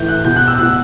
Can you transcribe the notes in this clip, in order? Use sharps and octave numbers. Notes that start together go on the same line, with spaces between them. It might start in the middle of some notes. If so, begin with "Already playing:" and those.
Already playing: A2 E3 G6
F#6
B2 G6
F#6
E6
B2 F#6